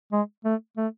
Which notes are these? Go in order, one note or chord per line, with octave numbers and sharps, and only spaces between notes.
G#3
A3
A3